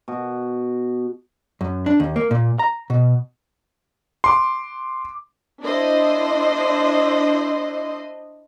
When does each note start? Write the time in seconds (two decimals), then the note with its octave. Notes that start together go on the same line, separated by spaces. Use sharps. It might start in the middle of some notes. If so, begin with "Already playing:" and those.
0.08 B2 F#4
1.61 F#2
1.86 D4
2.00 D#2
2.16 A#3
2.31 A#2
2.59 A#5
2.90 B2
4.24 C6 D6
5.64 D4 E4 C5 D#5